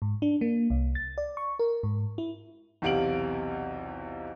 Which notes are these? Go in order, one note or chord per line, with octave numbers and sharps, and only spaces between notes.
G#2
D4
A#3
C2
A6
D5
C#6
A#4
G#2
E4
B1 E2 C3 F5 D7 F#7